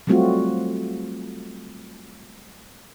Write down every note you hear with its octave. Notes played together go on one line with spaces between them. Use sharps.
F#3 G3 A3 C4 F4 F#4